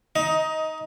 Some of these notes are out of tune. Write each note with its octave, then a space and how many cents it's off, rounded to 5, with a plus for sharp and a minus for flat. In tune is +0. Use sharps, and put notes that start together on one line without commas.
D#4 +10 D#5 +20